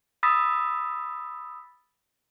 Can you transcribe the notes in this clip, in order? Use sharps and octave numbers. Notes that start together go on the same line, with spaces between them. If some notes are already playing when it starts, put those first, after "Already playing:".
B5 D#6 E6 A6 B6